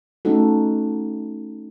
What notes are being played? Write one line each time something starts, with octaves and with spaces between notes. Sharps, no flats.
A3 C#4 D#4 F#4 A4